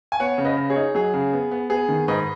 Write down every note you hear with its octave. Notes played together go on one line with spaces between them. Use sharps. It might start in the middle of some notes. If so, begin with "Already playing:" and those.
G#5
B3 C#5 F#5
C#3
B4 D#5
C#3
G#4 C#5
D#4
F#3 G#4
C#3
B3
B3
B3 G#4
D#3
G#2 B4 D#5